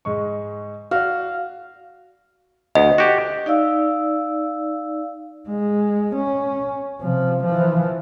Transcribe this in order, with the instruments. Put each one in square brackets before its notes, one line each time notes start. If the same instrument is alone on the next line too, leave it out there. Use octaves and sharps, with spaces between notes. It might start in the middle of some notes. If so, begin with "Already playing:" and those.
[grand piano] G#2 G#3 C#6
[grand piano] F#4 D5 [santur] F5
[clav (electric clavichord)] D2 [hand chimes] D#5
[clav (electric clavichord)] F#4 G4
[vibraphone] D#4 D5 F5 E6
[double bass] G#3
C#4
C3 F3
E3 F3